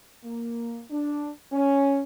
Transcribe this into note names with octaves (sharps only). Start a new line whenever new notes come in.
A#3
D4
C#4